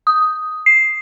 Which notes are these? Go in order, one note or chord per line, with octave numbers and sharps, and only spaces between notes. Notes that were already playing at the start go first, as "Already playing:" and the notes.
D#6
C7